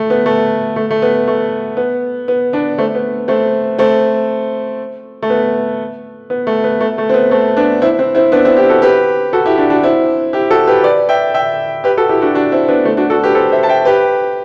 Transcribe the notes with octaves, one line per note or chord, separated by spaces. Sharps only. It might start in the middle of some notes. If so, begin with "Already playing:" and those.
Already playing: A3
B3
A3
A3
A3
B3
A3
B3
B3
B3 D4
A3 C4
B3
A3 C4
A3 C4
A3
B3
B3
A3
B3
A3
A3
C4
B3
A3 C4
B3 D4
C4 E4
C4 E4
C4 E4
B3 D4
C4 E4
E4 G4
F#4 A4
G4 B4
F#4 A4
E4 G4
D4 F#4
D4 F#4
C4 E4
E4 G4
F#4 A4
G4 B4
B4 D5
E5 G5
E5 G5
G4 B4
F#4 A4
E4 G4
D4 F#4
D4 F#4
C4 E4
B3 D4
A3 C4
D4 F#4
F#4 A4
G4 B4
A4 C5
C5 E5
A5
E5 G5
G4 B4